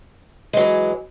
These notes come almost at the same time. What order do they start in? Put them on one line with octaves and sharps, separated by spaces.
G#3 F#3 E3